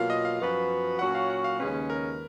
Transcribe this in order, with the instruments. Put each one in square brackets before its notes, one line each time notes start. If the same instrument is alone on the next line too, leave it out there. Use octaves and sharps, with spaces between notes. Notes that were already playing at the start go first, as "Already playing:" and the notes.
Already playing: [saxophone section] B2 F#3 A#3 F4 [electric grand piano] F5
[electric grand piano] D#5
F5
[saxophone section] F#2 F3 B3 F#4 B4 [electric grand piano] F5
[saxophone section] A#2 F#3 C#4 F#4 [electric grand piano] F#5
[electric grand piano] F5
F#5
F5
[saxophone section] D#2 C#3 G#3 C#4 [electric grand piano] B4
[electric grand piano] A#4